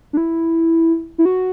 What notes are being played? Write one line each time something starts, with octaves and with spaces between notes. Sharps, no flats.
D4
E4
E4
F#4